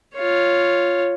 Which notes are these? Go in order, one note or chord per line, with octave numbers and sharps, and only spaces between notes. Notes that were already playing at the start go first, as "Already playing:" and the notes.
F4 C#5